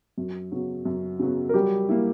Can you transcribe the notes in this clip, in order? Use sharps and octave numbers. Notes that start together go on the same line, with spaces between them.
F#2
C#3 F#3 B3
F#2
C#3 F#3 B3
A#4
F#3 G3 G4
A#3 E4